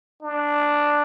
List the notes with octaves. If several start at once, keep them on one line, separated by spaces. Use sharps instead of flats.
D4